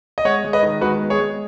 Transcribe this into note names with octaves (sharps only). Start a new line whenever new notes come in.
D#5
G#3 C#5 F#5
G#3
B4 D#5
D#3
G#3 F#4 B4
B3
G#4 C#5
G#3